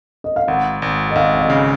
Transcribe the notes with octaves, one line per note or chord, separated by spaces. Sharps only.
D#5
F5
G#1 F#5
G#1
D#5
G#1 F5
F5
D#5
C#3